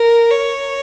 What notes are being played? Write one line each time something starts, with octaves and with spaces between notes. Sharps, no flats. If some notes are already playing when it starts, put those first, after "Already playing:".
Already playing: A#4
C#5